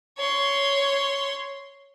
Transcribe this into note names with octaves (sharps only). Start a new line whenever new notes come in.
C#5 C6